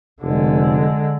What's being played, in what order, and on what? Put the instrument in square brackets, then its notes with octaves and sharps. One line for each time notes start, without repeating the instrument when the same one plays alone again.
[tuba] F1 [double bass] D3 G#3